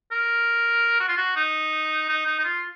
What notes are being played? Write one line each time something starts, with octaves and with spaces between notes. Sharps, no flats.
A#4
F#4
F4
F#4
D#4
D#4
D#4
D#4
F4